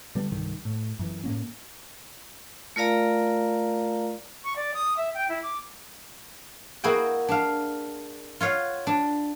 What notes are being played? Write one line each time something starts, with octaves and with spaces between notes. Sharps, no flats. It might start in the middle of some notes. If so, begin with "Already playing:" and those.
D3 G3 B3
C2 G2 D#3
A2
F#2 E3
A2 A#3 C#4
A3 F4 A#4 D5 F5 A#5
C#6
D5
D#6
E5
G5
E4
D6
A#3 E4 F#4 G#4 G5
D4 F5
F4 C#5 F5 F#5
D4